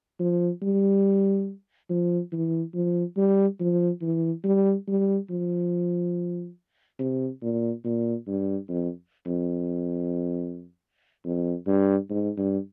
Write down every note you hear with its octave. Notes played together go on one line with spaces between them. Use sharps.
F3
G3
F3
E3
F3
G3
F3
E3
G3
G3
F3
C3
A#2
A#2
G2
F2
F2
F2
G2
G#2
G2